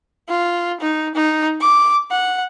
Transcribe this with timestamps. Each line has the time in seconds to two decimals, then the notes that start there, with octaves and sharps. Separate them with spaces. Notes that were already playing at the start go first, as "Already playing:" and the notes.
0.29 F4
0.80 D#4
1.15 D#4
1.60 D6
2.11 F#5